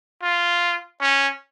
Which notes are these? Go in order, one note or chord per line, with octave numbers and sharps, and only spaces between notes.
F4
C#4